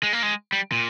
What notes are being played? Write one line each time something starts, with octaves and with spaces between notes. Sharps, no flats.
G#3
A#3
G#3
G3
A#2